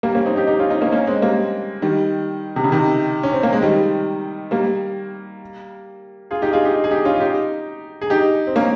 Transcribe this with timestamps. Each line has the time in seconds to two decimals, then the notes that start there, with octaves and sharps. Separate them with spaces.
0.03 G3 A#3
0.15 A#3 C#4
0.25 C4 D#4
0.36 D#4 G4
0.47 D#4 G4
0.59 C#4 F4
0.70 C4 D#4
0.81 A#3 C#4
0.92 A#3 C#4
1.07 G#3 C4
1.22 G3 A#3
1.82 D#3 G3
2.56 C3
2.64 C#3
2.72 C3 D#3
3.23 C#4
3.33 C4
3.43 A#3
3.53 G#3
3.62 D#3 G3
4.51 G3 A#3
6.31 F4 G#4
6.42 D#4 G4
6.53 F4 G#4
6.64 D#4 G4
6.84 G#4
6.91 D#4 G4
7.05 C#4 F4
7.16 F4
7.20 D#4 G4
8.01 G#4
8.10 D#4 G4
8.47 C4
8.56 A#3 C#4